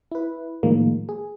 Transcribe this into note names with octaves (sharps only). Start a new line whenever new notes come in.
E4 B4
A2 D#3 F3 G#3 A#3
G#4